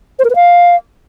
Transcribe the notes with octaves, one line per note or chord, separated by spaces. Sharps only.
C5
A#4
B4
F5